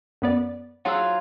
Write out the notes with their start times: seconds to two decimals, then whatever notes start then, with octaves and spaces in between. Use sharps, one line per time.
0.22 F#2 B3 D5
0.85 F#3 F4 G#4 F#5 E6